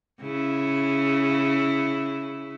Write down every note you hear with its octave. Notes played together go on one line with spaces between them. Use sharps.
C#3 E4